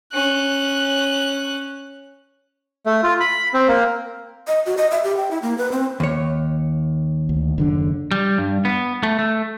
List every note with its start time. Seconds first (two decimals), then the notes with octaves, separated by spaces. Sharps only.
0.12 C#4 F#6
2.86 A3
3.03 F4
3.20 B5
3.54 C4
3.68 A#3
4.48 D#5
4.66 F#4
4.78 D#5
4.91 E5
5.04 G4
5.17 G5
5.31 E4
5.42 A#3
5.58 B4
5.72 C4
6.00 D#2 C#5
7.29 D2
7.58 F#1 D3 D4
8.12 G3
8.38 G2
8.65 B3
9.03 A3
9.19 A3